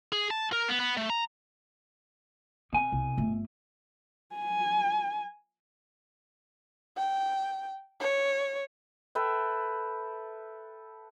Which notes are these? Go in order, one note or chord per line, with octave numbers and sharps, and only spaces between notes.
G#4
A5
A#4
B3
B3
A3
A#5
B2 C4 G#5
C2
G1 A3
G#5
G5
C#5
A4 B4 E5 G5